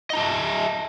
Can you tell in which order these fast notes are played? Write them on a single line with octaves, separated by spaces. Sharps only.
D#5 A#5 A5 E5